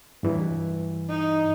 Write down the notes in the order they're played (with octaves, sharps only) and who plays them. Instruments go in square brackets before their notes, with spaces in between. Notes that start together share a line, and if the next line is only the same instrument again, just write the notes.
[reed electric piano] G2 E3
[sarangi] D#4